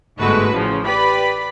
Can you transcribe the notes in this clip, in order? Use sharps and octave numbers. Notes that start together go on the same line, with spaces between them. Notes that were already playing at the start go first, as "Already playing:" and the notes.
G1 G#2 G#3 A3 F#4 B4
A1 A2 C#3 F3
G4 B4 D5 B5 B6